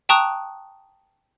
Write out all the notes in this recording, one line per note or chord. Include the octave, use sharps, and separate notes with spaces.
G5 A5 A#5 C#6 D#6 F#6